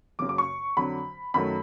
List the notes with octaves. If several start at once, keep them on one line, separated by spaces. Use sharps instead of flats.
F#1 F#2 C#3 D6
D6
C#6
F2 D3 F#3 B5
F#2 D#3 F#3 A3 B5